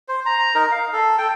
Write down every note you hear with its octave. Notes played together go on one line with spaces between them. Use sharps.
C5
A#5
D#4 A#4
F5
A4
A4 G5